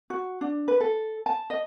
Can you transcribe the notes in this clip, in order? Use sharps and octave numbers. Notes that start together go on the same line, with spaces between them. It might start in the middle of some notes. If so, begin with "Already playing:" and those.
F#4
D4
B4
A4
A5
D#5